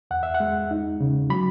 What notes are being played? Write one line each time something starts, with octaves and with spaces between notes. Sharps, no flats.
E2 F#5
E5
F#5
G#3
D#4
C#3
F#3 B5